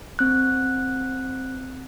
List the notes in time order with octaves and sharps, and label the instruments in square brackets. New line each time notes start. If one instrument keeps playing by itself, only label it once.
[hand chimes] C4 F#6